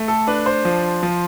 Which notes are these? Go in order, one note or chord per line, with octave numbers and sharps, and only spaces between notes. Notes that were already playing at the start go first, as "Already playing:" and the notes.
Already playing: A3
A4
D4 B4
C5
F3
F3